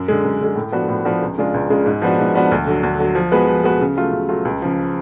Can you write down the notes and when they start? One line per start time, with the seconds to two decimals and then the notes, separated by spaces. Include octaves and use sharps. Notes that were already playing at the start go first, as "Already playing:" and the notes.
Already playing: F#2
0.08 D3 G#3
0.25 F#2
0.41 D3 G#3
0.56 A2
0.72 F3 B3 D4 F#4
0.89 A2
1.05 F3 B3 D4 F#4
1.22 C#2
1.38 C#3 G#3 D4 F4
1.54 C#2
1.70 C#3 G#3 D4 F4
1.86 G#2
2.02 F3 B3 D4 F#4
2.19 G#2
2.34 F3 B3 D4 F#4
2.52 D2
2.67 D3 F#3
2.83 D2
2.99 D3 F#3
3.15 F3
3.32 G#3 B3 F#4 B4
3.48 F3
3.64 G#3 B3 F#4 B4
3.81 C#3
3.96 F#3 A3 F4
4.12 C#3
4.29 F#3 A3 F4
4.45 C#2
4.62 C#3 F3